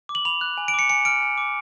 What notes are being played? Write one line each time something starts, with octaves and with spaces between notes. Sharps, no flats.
D6
F#7
B5 F7
F#6
G#5
D7
D6 C#7
G#5 C#7
F6 D7
G#5
D6